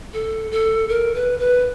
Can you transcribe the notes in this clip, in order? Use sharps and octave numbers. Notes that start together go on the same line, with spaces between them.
A4
A4
A#4
B4
B4